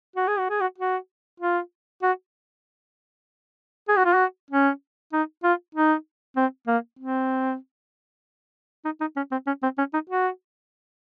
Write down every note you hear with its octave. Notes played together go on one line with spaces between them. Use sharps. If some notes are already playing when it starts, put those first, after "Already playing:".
F#4
G#4
F#4
G#4
F#4
F#4
F4
F#4
G#4
F#4
F4
F#4
C#4
D#4
F4
D#4
C4
A#3
C4
D#4
D#4
C#4
C4
C#4
C4
C#4
D#4
F#4